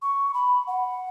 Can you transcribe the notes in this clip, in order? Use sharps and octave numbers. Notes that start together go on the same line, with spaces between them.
C#6
B5
F#5